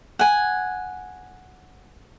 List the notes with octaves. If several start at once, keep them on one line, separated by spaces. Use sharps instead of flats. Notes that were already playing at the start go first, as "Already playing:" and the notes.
F#5 G#5